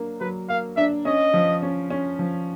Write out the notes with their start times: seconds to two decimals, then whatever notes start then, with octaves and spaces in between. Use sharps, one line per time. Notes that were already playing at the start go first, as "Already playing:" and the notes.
Already playing: F#3 A#3 D4
0.20 F#3 B4
0.49 A#3 F5
0.77 D4 E5
1.05 C#4 D#5
1.34 F3
1.62 C#4
1.90 C#4
2.19 F3